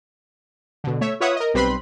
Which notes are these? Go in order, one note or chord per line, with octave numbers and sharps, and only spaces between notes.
B2 D3
A3 C#5 E5
F4 B4 C#5 E5 F#5 D#6
A#4 D#5
B1 G3 C4 B4 B5 C6